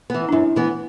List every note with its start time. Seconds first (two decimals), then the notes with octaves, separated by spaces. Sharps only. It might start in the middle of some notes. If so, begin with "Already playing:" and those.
0.10 E3 B3
0.29 D4
0.32 F#2 E4
0.56 E3 B3